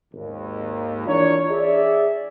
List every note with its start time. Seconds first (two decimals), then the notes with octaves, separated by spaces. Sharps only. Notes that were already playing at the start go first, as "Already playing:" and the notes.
0.14 G#1 D#2
1.06 E3 D4 F4 A#4 C#5
1.49 G#4 D5 E5